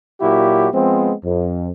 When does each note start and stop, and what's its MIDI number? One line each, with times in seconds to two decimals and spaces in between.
0.21 0.68 46
0.21 0.68 54
0.21 0.68 64
0.21 0.68 66
0.21 0.68 67
0.73 1.12 53
0.73 1.12 56
0.73 1.12 59
0.73 1.12 60
1.24 1.70 41